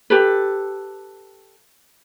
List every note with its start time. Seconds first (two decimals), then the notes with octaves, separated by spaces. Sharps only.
0.10 G4 A4 B4